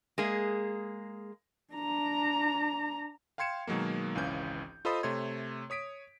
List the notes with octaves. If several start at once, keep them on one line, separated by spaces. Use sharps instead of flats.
G#3 A#3 G#4
D4 A#5
F5 G5 C6 G#6 C#7 E7
B2 D#3 F#3 G#3 A#3
G#1 C#2 E3 C#4 F5 G6
F4 A4 C5 D#5 B5 D#6
C3 A3 A4 C#5 C6 G#6
C#5 D#6 B6 D7